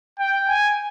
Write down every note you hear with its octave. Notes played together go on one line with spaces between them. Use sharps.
G5
G#5